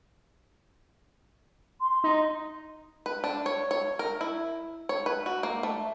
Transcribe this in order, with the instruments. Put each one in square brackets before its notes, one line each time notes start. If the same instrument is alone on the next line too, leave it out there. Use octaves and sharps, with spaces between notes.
[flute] C6
[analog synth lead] D#4
[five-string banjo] B4
D4
C#5
C#5
A#4
E4
C#5
B4
F#4
A#3
A3